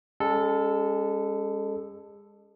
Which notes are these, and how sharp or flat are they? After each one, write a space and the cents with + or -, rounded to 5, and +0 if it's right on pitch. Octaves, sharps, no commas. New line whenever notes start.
G#3 -35 C#4 +0 A4 +0